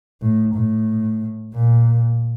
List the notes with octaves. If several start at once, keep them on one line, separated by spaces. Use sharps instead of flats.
A2
A2
A#2